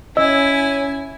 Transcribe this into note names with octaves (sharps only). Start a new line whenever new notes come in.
C#4 E4 D#5 G#5 E6